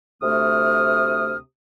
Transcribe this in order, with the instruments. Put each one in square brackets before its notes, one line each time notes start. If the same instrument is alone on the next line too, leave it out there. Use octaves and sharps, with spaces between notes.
[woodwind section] D2 C3 A3 D#6 F6